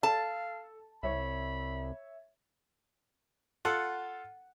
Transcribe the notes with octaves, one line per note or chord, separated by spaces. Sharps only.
A4 F5 A5
C2 C#5 E5 B5
F4 A4 F#5